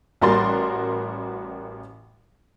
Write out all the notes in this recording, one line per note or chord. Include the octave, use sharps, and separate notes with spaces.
A1 G3 F#4 A#4 C6 A6